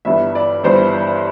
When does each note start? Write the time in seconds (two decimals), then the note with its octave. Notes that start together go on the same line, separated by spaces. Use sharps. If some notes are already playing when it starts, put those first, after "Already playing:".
0.05 G1 G2 E3 E5
0.35 D5
0.63 G1 G2 E3 C5